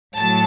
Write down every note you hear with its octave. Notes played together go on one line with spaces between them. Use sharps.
A2 F#3 A5